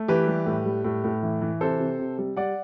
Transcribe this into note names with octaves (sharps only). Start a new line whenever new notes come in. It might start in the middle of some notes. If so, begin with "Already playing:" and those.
Already playing: A3
E3 G4 B4
G3
A2
G3
A2
A2
E3
E3
C3 A4 C5
C3
C3
G3
G3 D5 F#5